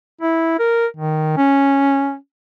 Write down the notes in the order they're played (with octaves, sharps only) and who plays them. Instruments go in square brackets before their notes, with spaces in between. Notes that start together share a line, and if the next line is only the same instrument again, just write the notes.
[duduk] E4
A#4
D#3
C#4